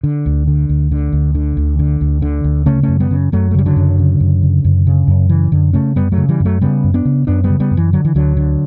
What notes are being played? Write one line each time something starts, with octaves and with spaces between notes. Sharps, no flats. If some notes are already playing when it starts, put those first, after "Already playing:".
D3
D2
D3
D2
D3
D2
D3
D2
D3
D2
D3
D2
C#3 A3 C#4
F#2 A3 C#4
G3 B3
C#3
F#2 F#3 A3
A3
C#3 G3
D3 F#3
F#2
C#3
F#2
C#3
F#2
C#3
F#2
C#3 E3
F#2 D3
C#3 A3 C#4
F#2 G3 B3
F#3 A3
C#3
E3 G3
F#2
F#3 A3
C#3 G3 B3
F#2
B3 D4
C#3
F#2 B3 D4
G3 B3
C#3
G3 B3
F#2
E3
D3 F#3
E3
D2 D3 F#3
D3